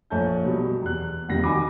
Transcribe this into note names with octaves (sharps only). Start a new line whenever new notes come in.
A#1 A3 C#5 G#5 A5 G6
B2 F#3 G3
E2 F#6
E1 F2 D#3 G3 A#6
D#4 F#4 G#5 B5 D6